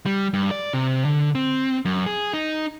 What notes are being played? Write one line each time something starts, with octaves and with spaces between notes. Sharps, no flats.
G3
G2
D5
C3
D3
C4
F#2
G#4
D#4